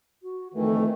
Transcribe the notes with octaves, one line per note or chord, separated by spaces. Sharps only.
F#4
F2 D#3 E3 A3